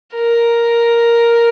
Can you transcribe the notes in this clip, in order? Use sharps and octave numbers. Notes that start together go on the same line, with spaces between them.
A#4